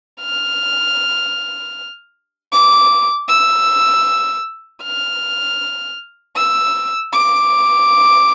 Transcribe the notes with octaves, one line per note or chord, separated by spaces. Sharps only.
F6
D6
E6
F6
E6
D6